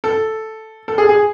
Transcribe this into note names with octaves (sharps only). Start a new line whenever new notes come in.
A4
A4
G#4
G#4